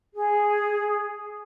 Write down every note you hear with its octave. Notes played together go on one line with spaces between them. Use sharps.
G#4